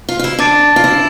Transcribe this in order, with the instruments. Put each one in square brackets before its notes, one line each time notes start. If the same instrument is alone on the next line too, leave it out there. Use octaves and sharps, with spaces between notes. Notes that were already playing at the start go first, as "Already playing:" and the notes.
[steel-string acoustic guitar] F4
F4
E4
[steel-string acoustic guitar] D4 [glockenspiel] A5 D6 A6 D7
[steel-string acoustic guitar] F4
E4